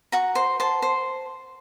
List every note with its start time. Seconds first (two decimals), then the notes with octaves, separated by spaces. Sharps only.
0.12 F#4 A#5
0.35 C5
0.60 C5 A5
0.82 C5